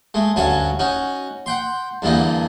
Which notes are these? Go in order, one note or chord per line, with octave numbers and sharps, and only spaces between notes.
G#3 A3
D2 G2 C#4 F#4 G#5 A5
C#4 D#4 F#4
F#5 G5 C6
E2 G2 D3 E3 A#3 D#4